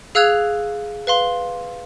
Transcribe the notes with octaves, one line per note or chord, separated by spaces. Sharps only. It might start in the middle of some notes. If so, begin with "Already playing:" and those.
G#4 F5 E6 F#6 G#6 F7
B4 F5 C6